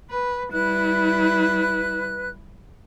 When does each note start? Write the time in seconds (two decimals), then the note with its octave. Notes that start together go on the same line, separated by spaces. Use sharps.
0.11 B4
0.52 G3 E4 B4 F#6